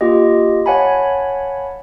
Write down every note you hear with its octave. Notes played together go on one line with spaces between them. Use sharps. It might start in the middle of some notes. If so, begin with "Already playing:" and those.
A#3 F4 G4 D#5
C#5 F5 F#5 G#5 A5 B5